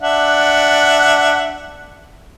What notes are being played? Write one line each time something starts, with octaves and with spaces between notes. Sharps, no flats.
D4 E5 F#5